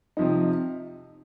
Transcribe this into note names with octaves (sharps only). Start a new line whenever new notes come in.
C3 F3 D#4